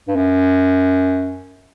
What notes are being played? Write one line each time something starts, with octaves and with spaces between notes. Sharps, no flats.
G2
F#2